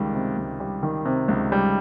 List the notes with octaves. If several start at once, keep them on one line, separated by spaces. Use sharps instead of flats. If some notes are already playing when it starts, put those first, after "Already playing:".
Already playing: C#2 D#3 G3
C3
C#2
G3
D#3
C3
C#2
G3